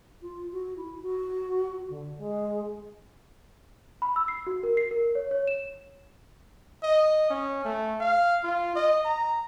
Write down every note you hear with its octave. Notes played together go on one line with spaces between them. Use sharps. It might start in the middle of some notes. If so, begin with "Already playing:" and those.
F4
F#4
E4
F#4
D3
G#3
B5
E6
C7
F#4
A#4
C7
A#4
C#5
C#5
E7
D#5
C#4
A3
F5
F4
D#5
A#5